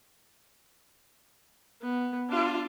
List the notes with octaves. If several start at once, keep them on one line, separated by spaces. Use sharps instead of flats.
B3
D4 F4